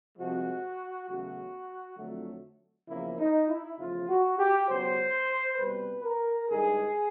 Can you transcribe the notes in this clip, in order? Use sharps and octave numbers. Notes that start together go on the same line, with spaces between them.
C2 C3 F3 G#3 F#4
E2 C#3 F#3 A3 F#4
F2 D3 F#3 A3
E2 C#3 F3 A#3 E4
D#4
E4
E2 C#3 F3 A3 F4
F#4
G4
C#2 B2 F#3 C5
C2 B2 G3 B4
A#4
G2 D#3 G#3 G#4